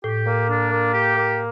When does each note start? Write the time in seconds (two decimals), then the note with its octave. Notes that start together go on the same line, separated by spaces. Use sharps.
0.04 A2 G4
0.26 A#3
0.49 D4
0.71 A#3
0.94 G4
1.16 A#3